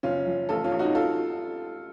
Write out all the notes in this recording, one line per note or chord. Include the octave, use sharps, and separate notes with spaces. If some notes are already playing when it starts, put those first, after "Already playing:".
F#1 C#4 F4
F3
A1 F4 A4
C#4 F4
A1
D#4 F#4
F4 A4